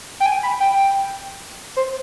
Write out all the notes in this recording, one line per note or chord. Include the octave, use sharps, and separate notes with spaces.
G5
G#5
B5
G5
C5